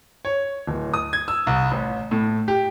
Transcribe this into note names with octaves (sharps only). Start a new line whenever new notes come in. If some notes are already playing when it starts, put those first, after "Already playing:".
C#5
D1
D#6
G#6
E6
C2
A1
A2
G4